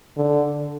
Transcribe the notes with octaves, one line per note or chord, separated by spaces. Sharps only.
D3